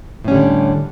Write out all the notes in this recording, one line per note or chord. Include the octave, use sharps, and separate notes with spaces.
A2 D3 G3 C#4